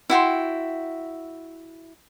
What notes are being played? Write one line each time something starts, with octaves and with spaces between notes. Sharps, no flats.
E4 F#4 G5 C6